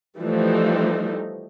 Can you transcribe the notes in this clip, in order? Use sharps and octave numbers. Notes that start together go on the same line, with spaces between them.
E3 F3 G3 A3 D#4